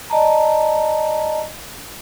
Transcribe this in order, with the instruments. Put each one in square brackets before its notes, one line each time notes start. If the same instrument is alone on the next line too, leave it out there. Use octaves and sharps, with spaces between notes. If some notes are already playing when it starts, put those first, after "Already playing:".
[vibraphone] D5 D#5 A5 A#5